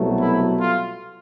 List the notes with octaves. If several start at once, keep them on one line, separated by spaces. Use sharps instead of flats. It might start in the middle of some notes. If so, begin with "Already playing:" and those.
Already playing: C2 B2 F#3 A3
E4
F4